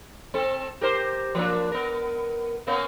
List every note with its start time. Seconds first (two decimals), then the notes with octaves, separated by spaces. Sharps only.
0.34 C4 A4
0.81 G4 A#4 C5
1.35 F3 A#3 D4
1.72 B3 A#4
2.67 A#3 B3 C#4